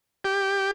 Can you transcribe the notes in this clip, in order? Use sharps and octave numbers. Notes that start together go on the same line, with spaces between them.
G4